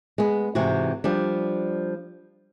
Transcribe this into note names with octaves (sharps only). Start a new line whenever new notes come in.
G#3 B3
G#2 C3 E3 C4 F#4
F3 G3 D4